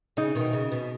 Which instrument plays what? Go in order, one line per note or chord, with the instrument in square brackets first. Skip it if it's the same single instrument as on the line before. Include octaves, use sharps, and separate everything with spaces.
[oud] C#3 [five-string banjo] D#4
[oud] B2 D#3
C#3
B2